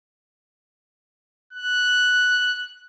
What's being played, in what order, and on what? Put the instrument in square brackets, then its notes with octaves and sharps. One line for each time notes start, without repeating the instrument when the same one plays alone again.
[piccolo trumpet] F#6